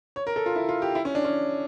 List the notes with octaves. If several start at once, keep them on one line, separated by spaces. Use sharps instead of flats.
C#5
A#4
A4
F4
E4
F4
G4
E4
C#4
D4
C#4